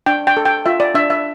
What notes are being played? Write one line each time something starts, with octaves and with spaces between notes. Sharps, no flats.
D4 G5
G5
A4
G5
F4 E5
D5
D4 E5
E5